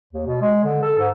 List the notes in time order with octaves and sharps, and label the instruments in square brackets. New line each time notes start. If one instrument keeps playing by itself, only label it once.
[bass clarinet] D#2
B2
G#3
D3
A4
G#2